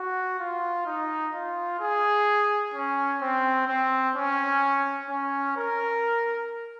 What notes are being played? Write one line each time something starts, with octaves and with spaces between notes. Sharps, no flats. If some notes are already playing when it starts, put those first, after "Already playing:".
Already playing: F#4
F4
D#4
F4
G#4
C#4
C4
C4
C#4
C#4
A#4